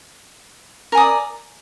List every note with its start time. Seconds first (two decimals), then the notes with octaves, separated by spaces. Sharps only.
0.92 A#4
0.95 G#5
0.97 D#6
1.00 D5